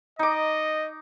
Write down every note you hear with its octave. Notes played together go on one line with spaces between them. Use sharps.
D#4 D#5 D6